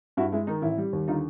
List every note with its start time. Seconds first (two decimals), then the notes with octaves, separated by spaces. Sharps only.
0.17 G2 E4 F#4
0.32 G#3 E4
0.47 D#3 D#4
0.62 A1 E4
0.78 G3
0.93 D#2
1.08 D3 D#4 F4